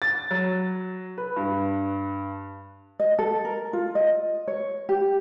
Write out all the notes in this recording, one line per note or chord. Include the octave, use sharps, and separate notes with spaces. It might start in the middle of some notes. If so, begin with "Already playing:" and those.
A6
F#3
B4
G2
D#5
A4
A#4
F4
D#5
C#5
G4